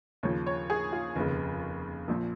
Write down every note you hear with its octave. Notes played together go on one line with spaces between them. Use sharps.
D#2 C#3 F3 C#5
C#5
G#4
F4
F1 D#2 C#3
A#1 A#2 F3